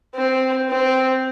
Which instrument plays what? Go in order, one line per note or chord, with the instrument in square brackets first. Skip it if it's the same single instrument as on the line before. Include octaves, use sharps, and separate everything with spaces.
[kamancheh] C4
C4